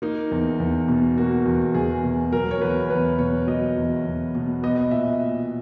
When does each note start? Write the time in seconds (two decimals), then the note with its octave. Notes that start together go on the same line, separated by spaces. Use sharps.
0.02 A#3 D#4
0.31 E2
0.60 E2
0.88 B2
1.17 A#3 F#4
1.46 E2
1.74 E2 G#4
2.04 B2
2.32 F#3 A#4
2.51 C#5
2.62 E2 B4
2.90 E2 B4
3.19 B2 C#5
3.47 F#3 D#5
3.77 E2
4.06 E2
4.35 B2
4.63 B3 D#5
4.77 D#5
4.91 A#2 E5
5.20 A#2